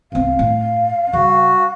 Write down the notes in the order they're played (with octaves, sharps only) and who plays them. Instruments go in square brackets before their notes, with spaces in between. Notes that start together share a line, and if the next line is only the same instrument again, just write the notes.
[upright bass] C2 C4 [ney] F5
[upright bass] A2
[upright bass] C#3 G3 [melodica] F#4